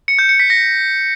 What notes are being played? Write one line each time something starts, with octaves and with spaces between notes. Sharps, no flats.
C#7
G6
C#7
B6
A#6